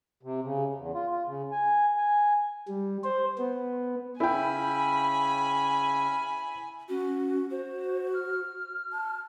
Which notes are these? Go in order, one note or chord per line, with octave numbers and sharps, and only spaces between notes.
C3
C#3
E2
F4
F4
C#3
G#5
G#5
G3
C5
B3
C#3 C#4 E4 G5 G#5 B5
C#4 F#4
F#4 C5
F6
A5